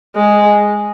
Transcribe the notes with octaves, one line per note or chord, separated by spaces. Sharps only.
G#3